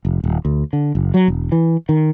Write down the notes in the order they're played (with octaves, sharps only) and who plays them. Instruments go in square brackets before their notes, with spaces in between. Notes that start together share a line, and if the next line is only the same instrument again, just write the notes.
[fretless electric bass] F1
D#1
D2
D3
F#1
F#3
E1
E3
D#3